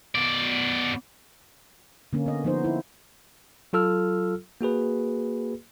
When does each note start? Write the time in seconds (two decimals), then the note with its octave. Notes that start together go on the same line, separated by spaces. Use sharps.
0.15 B2 D5
2.13 D3 A#3 C#4
2.26 B3 D#5
2.44 F3 B3 D#4 C5
2.64 E4
3.73 F#3 F4 A4 E6 F6
4.61 A#3 F#4 G#4 B4